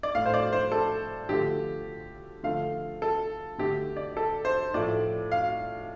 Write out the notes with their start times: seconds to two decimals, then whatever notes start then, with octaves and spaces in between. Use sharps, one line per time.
0.03 D5
0.15 A2 A3 F5
0.26 C5
0.34 D5
0.53 C5
0.72 A4
1.29 D3 F3 A3 G4
2.43 D3 F3 A3 F5
3.02 A4
3.58 D3 A3 G4
3.97 D5
4.17 A4
4.45 C5
4.74 A2 F3 A3 D5
5.32 F5